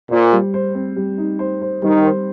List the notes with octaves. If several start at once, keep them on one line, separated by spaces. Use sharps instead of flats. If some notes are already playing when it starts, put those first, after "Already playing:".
A#2 C5
G3
C5
C4
G3
D#4
C5
C5
D#3 G3
C5